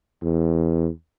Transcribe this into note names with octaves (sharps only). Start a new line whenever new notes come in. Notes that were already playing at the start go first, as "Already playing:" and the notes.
E2